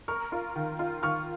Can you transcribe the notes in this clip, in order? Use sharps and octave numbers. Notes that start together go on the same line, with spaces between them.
A#4 C#6 F6
F4
D#3
F4
D#3 C#6 F6